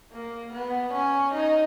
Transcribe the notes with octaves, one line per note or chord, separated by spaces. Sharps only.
A#3
B3
C#4
D#4